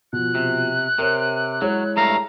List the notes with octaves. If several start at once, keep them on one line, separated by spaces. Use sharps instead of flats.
B2 F3 F#6
C3
C3 A#4 C#5
F#3 G#3 E4 C#5
G2 A3 F5 A#5